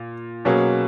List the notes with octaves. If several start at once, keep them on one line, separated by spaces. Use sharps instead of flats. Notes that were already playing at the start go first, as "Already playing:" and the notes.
Already playing: A#2
B2 F#3 A#3 C#4 G#4